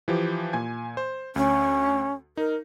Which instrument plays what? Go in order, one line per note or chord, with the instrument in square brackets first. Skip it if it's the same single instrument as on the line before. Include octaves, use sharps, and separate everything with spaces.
[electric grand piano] E3 F3 G4
A#2 G#5 G#6
C5
[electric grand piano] D2 [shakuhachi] C#4
[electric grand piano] D#4 [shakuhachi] A#4